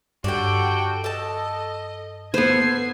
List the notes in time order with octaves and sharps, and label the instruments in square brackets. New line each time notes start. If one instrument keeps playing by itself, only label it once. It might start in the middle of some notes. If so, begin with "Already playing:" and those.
[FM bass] G2 [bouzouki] D3 G3 D4 [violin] F#4 G5
[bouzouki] A4 A5 [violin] D#5
[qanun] B3 C5 [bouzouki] A4 B4 [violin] G#6 C7